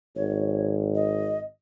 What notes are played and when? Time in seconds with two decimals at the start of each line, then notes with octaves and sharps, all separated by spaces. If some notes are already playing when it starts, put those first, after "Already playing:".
0.16 G#1 C#5
0.95 D#5